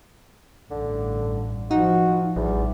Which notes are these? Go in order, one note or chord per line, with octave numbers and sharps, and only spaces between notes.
A1 G2 D3
F3 D#4 F#4
A1 E2 G3